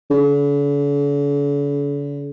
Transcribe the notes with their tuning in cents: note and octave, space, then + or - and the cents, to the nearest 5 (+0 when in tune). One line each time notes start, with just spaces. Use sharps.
D3 -45